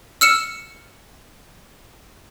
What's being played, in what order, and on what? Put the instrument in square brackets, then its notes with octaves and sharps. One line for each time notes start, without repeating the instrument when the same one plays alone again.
[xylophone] E6 F6 C#7 E7